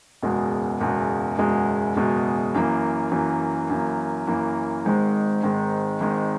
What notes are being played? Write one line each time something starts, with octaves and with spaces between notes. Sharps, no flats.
F#1 E2 B2 G#3
F#1 E2 B2 G#3
F#1 E2 B2 G#3
F#1 E2 B2 G#3
F#2 E3 A#3
F#2 E3 A#3
F#2 E3 A#3
F#2 E3 A#3
G#1 G#2 D#3 G#3
G#1 G#2 D#3 G#3
G#1 G#2 D#3 G#3